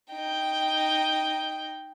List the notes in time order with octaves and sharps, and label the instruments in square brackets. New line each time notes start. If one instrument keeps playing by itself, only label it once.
[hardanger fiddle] D#4 G5